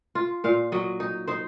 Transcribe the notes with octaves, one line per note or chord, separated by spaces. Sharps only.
F4
A#2 F5
F#3 D#5
D#4
D#4 C5